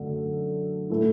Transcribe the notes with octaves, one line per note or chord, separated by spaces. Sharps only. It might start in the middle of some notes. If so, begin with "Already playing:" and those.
Already playing: F#2 D3 A3
A2 A3 E4